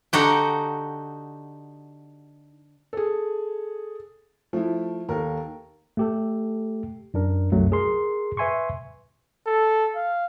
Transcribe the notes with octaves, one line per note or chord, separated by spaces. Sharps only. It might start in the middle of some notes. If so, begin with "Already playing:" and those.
D3 D#4 F#4 G4
G#4 A4
F3 A3 E4
D#2 A4 A#4
A3 G4 A4
F#2 D4 A#4
C2 F#2 F#3 A3
G#4 A#4 C6
B4 E5 G#5 C6 C#6
A4
F5